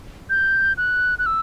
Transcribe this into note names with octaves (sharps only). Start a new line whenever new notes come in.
G6
F#6
F#6
E6